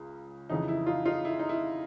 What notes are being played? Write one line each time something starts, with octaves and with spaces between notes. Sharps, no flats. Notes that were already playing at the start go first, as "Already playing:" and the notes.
Already playing: C#2 C#3
F2 C#3 E3 D#4
E4
D#4 F4
D#4 F4
E4
D#4
E4